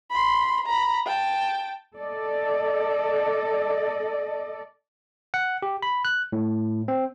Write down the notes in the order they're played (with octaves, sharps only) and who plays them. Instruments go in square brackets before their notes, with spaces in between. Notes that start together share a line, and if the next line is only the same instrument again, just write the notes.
[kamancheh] B5 C6
A#5 B5
G5 A5
[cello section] A4 D5 D#5
[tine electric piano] F#5
G4
B5
F#6
A2
C4